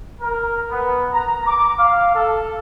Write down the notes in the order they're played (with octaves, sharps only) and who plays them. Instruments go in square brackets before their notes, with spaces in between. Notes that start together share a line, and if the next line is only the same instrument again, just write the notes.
[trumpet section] A#4
B3
A#5
D6
F5
A4